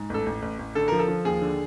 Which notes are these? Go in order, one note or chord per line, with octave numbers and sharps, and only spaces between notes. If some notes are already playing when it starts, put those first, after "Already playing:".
Already playing: G#2
A1 A4
A1
A1
A1
D3 A4
F3 A#4
A4
F3
D#2 G#4
D3